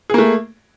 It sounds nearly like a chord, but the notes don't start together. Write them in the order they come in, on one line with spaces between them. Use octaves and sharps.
G#4 A#3 A3